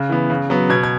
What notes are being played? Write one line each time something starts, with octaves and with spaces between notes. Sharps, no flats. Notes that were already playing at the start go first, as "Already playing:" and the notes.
Already playing: C#3 F#6
E3 B3
C#3
F#3 B3
B2 G#6
G#6